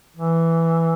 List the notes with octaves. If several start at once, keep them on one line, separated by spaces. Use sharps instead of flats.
E3